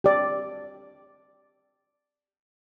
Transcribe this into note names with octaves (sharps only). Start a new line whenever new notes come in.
G4 D5